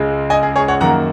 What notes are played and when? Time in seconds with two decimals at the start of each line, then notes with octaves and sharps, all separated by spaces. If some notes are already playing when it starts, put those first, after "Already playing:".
Already playing: C#2 C#3 G#3
0.30 D#5 G#5
0.43 G#4
0.56 G#4 C#5
0.68 C#5 F#5
0.81 F#2 D#3 A#3 F#5 A#5